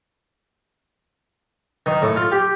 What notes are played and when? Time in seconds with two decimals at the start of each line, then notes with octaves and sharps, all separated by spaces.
1.86 D#3
2.02 A2
2.16 F4
2.32 G4